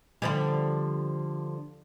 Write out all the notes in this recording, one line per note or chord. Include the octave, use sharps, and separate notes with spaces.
D3 F3 G3